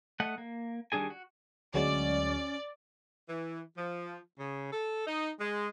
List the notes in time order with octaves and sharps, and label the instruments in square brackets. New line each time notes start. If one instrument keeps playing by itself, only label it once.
[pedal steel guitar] A3 D#5 F#5
A#3
D#3 G3 D4 G#4 G#5
F#4
[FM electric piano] D2 F#3 G#3 [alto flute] C#4 [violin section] D5
[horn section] E3
F3
C#3
A4
D#4
G#3